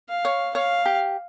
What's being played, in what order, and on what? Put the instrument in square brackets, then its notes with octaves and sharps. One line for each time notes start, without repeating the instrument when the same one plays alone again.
[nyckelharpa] F5
[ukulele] C#5
[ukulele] C#5 [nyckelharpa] F5
[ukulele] G4